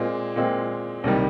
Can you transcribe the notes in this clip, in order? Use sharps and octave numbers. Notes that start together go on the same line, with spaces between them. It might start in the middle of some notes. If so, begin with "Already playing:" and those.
Already playing: A#2 G#3 C4
A#2 G#3 C4
C2 C3 D#3 G3